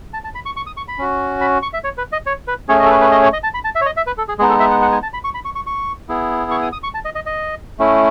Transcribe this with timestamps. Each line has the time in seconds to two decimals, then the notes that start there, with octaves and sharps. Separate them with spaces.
0.13 A5
0.24 A5
0.35 B5
0.46 C#6
0.57 C#6
0.67 D#6
0.77 C#6
0.88 B5
0.98 C#4 F#4
1.41 B5
1.62 C#6
1.73 E5
1.84 C#5
1.98 B4
2.12 D#5
2.26 C#5
2.48 B4
2.69 A3 C#4 G#4 C#5
2.80 D#5
2.86 A4
2.90 B4
3.01 B4
3.12 D#5
3.23 C#5
3.33 D#5
3.43 A5
3.54 B5
3.65 A5
3.75 E5
3.81 C#5
3.86 D#5
3.97 E5
4.07 B4
4.18 A4
4.28 G#4
4.39 G#3 B3 D#4 G#4
4.49 A4
4.60 E5
4.71 F#5
4.82 F#5
4.92 G#5
5.03 A5
5.13 B5
5.24 C#6
5.35 B5
5.45 C#6
5.55 C#6
5.67 C#6
6.09 B3 E4 G#4
6.51 C#6
6.63 D#6
6.73 D#6
6.83 C#6
6.94 A5
7.05 D#5
7.15 D#5
7.26 D#5
7.79 A3 C#4 E4